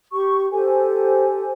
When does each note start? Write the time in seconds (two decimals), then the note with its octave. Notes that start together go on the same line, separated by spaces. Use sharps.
0.13 G4 C#6
0.52 G4 A4 C5 G#5